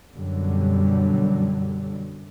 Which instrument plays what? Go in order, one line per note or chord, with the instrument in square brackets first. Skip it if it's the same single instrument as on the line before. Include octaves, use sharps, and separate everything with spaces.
[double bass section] F#2 B2 D3 F#3 G3